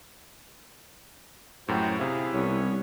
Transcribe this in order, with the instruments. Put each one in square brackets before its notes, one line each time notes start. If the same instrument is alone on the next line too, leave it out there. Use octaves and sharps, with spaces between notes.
[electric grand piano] F#2 A2 [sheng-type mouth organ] F#4 G4 C5
[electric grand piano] C3 E4 [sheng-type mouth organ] G#4 F5
[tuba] C2 [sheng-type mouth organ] B3 C#4 C#5